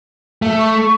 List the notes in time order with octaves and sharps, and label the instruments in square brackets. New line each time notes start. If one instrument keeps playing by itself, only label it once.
[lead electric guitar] A3
[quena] C#6